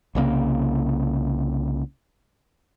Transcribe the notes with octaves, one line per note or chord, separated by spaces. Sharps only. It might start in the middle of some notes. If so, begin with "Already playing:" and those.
C2 C#3 G#3 A#3